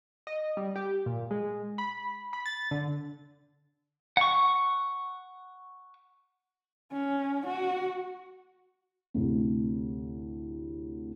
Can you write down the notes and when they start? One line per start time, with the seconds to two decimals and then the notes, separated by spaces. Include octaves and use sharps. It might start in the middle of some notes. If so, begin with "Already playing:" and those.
0.27 D#5
0.57 G3
0.76 G4
1.06 A#2
1.31 G#3
1.78 B5
2.33 B5
2.46 A6
2.71 D3
4.17 F#5 C#6
6.92 C#4
7.47 F#4
9.14 D2 A2 C3